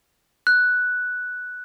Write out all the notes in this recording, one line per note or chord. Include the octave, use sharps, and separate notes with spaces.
F#6